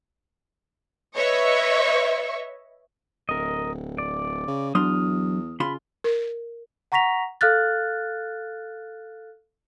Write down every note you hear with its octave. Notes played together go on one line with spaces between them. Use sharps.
B4 C#5 D#5 E5 C#6
D1 A#4 D#5
D5
C#3
E2 F#3 D4 C6 D#6 F6
C#3 F4 B5 C6
A#4
F#5 A#5 C#6 A#6 B6 F7
A4 F5 F6 F#6 A6